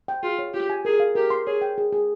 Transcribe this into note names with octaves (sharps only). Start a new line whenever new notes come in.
G5
F4 G#4
C#5
F4 G4
G#5
G#4 A#4
F5
G4 A#4
C6
G#4 C#5
G5
G#4
G#4